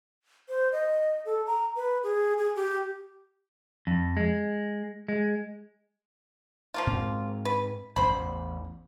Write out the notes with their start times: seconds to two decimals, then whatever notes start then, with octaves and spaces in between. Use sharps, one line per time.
0.49 C5
0.72 D#5
1.25 A4
1.47 A#5
1.76 B4
2.03 G#4
2.38 G#4
2.55 G4
3.87 F2
4.17 G#3
5.08 G#3
6.74 F3 A#3 F4
6.87 G#2 C4
7.45 B4
7.96 E1 A1 E2 C5 B5